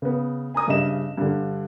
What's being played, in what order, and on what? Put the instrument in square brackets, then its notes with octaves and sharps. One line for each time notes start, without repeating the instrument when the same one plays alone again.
[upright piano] C#3 B3
G#5 A#5 D#6
G2 C#3 D#5 E5 E7
G2 D3